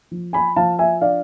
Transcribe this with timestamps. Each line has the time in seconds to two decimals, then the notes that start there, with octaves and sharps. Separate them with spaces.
0.11 F3
0.33 G#5 B5
0.56 F3 F5 A5
0.79 E5 G#5
1.01 D4 D5 F5